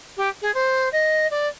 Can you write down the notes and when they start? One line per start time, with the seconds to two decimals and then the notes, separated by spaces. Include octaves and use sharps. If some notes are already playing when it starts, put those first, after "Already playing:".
0.17 G4
0.42 G#4
0.54 C5
0.92 D#5
1.30 D5